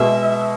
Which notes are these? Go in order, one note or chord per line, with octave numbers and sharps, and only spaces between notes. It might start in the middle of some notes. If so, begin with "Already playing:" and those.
Already playing: B2 G#3 B3 E5